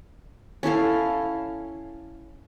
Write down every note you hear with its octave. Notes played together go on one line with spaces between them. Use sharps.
C#4 E4 A4 F5